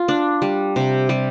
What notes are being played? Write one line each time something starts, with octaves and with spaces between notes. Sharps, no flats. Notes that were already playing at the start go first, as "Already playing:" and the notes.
Already playing: F4
D4
G3
C3
G3